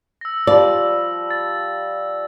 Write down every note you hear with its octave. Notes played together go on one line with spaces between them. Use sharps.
E6 A#6
F3 G3 D5
A6